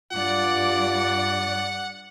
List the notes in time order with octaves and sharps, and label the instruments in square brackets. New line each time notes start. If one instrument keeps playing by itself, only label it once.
[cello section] G2 D5 [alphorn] F4 [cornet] F#5